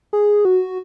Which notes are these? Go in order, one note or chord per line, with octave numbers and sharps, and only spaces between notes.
G#4
F#4